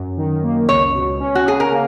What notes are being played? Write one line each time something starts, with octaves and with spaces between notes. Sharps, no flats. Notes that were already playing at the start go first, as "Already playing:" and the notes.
Already playing: F#2
D#3
A#3
C#2 C#5
B2
C#4
F#4
C#3 G#4
A#4
A#3